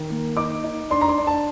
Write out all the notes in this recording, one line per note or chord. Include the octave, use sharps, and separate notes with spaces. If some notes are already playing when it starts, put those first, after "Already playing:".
Already playing: D#3
A#3
D#4 D6
D#4
D4 C6
A#5
C6
D4
A5